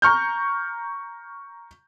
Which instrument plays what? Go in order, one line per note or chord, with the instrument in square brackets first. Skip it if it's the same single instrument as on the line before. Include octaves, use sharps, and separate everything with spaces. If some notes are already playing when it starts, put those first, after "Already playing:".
[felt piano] A#5 C#6 F6 G6